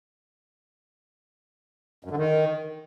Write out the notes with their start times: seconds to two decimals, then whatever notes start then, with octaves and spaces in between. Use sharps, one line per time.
2.05 F#2
2.11 D3
2.17 D#3